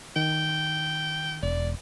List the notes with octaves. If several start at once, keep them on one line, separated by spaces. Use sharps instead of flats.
D#3 G5
E1 D5